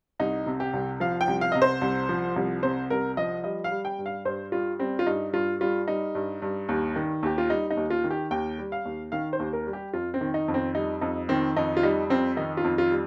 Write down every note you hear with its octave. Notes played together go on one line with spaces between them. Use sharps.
C2 D#4
C3
G4
C2
F3 F5
G5
C2
F5
C3 D#5
C5
C2
F3
C2
C3 C5
C2 A#4
F3 D#5
G3 D#5
F5
G3
G5
G2
F5
G2 C5
G3 F4
G3 C4
F4
G2 D#4
G2 F4
G3 F4
G3 D#4
G2
G2
D#2
D#3
D#2 G4
F4
G3 D#4
D#4
D#2
F4
D#3
G4
D#2 G5
G3
F5
D#2
D#3 F5
C5
D#2
A#4
G3
G4
F2 F4
C4
D#3
D#4
F2
C4
G3 D#4
F2 D#4
D#3 C4
F2 D#4
F4
G3 D#4
F2 C4
D#3 D#4
F4
F2
F4
G3